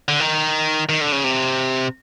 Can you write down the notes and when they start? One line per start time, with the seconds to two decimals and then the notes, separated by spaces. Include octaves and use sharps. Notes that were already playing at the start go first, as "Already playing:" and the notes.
0.08 D3
0.20 D#3
0.89 D#3
1.01 D3
1.12 C#3
1.24 C3